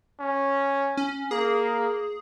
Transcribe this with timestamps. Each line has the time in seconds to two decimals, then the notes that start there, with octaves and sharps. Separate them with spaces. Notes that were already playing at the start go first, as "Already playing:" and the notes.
0.20 C#4
0.97 C#4
1.31 A#3 G#4